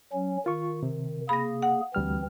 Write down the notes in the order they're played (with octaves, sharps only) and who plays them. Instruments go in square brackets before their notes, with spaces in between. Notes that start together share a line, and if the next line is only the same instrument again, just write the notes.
[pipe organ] F#3 C#4
[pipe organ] D#3 [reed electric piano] F4 C#6
[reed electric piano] C3
[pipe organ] A#3 G#4 [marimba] B5 A#6
[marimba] F#5
[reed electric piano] D2 G3 F6 [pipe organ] E3 C4